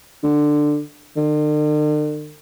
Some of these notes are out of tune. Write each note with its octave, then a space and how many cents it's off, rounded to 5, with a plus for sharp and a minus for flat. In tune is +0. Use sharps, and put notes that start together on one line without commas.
D3 +15
D3 +45